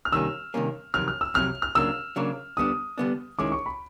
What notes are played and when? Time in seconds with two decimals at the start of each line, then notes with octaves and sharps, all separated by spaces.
0.05 F6
0.12 C3 D#3 G3 A#3 C#4 E6
0.54 C3 D#3 G3 A#3 C#4
0.94 F2 C3 D#3 F#3 F6
1.08 F6
1.21 E6
1.34 F2 C3 D#3 F#3 F6
1.62 F6
1.75 C#3 F#3 A#3 D4 E6
2.16 C#3 F#3 A#3 D4
2.57 D3 G3 B3 D4 D#6
2.98 D3 G3 B3 D4
3.39 D#3 G#3 C#4 E4 D6
3.52 C#6
3.66 B5